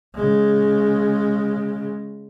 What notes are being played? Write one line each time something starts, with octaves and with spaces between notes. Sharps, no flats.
C#3 G#3